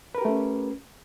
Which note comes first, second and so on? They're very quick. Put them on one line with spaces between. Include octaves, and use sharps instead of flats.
B4 A#4 G4 A3 C#4